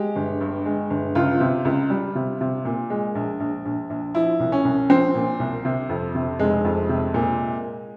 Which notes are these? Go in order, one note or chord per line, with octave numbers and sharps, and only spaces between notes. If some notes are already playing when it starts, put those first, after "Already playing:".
Already playing: G#3 G4
G1
G2
G#3
G1
C#2 F4
C3
C#2
G3
C3
C3
A#2
G#3
A#1
A#1
A#1
A#1
F3 E4
C2
C#4
C2
F3 C4
A#2
C2
C3
F2
C3
F1 G#3
F2
C3
A#2